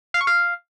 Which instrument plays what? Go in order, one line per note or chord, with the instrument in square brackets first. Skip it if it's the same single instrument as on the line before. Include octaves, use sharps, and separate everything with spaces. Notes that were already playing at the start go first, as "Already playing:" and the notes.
[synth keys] F5
C#6
F5